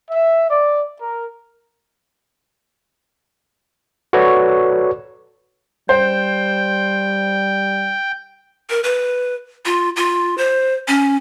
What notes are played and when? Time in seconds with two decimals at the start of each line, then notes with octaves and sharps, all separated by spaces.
0.11 E5
0.50 D5
0.99 A#4
4.13 F#4 A4 B4 C#5 D5
5.89 G3 C5 G5
8.70 A#4
8.84 B4
9.66 F4
9.96 F4
10.38 C5
10.88 C#4